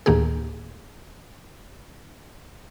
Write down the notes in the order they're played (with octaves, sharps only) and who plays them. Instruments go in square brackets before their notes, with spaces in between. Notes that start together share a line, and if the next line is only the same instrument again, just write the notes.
[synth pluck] D2 A2 D#3 A#3 G4 G#4